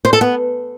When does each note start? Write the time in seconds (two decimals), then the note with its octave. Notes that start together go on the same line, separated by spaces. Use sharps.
0.05 C5
0.13 A4
0.21 B3